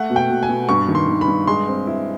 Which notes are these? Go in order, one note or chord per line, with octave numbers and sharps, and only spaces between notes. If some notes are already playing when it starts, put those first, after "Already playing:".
Already playing: A3 F#5
B2
G5
B2
G#5
B2
G2 C#6
D#3
C6
D#3
B5
G2
G#3 C6
C4
E4